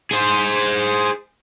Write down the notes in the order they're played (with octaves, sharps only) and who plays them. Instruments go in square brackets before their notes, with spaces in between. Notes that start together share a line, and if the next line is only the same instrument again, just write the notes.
[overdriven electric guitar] G#4 C5